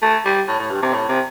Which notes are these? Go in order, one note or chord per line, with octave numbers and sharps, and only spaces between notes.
A3
G3
A2
A2
G2
C3
A2
C3